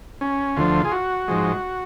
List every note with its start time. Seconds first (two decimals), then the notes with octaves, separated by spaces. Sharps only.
0.21 C#4
0.57 D2 D3 F3 F4
0.85 G#4
0.92 F#4
1.28 G#2 F3 G#3